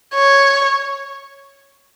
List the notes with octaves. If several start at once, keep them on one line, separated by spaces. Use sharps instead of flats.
C#5